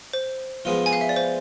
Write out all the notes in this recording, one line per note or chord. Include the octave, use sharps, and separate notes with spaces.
C5
F3 G#3 B3 F4
G#5
F5
E5
D5
C5